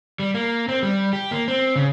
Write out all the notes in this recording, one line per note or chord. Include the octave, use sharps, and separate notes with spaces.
G3
A#3
C4
G3
G4
A#3
C4
C#3